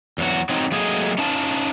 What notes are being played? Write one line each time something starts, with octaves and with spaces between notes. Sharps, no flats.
E2 F#3 F#4
F#3 C4 D#4
F#3 A3 A#3 C4 G#4 D#5
C#4 D#4 F4 A5